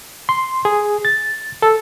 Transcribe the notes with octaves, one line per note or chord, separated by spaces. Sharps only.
C6
G#4
A6
A4